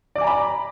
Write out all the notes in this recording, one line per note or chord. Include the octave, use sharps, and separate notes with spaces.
D5 G#5 A#5 B5 D6